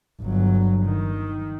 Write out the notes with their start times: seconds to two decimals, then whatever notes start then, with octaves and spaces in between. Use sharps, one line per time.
0.21 G1 F#3
0.85 D#3